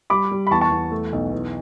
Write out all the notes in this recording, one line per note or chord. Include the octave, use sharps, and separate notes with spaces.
G3 B5 D6
G3
B5
E2 A5 C#6
A5 C#6
E2
A3
B1
E2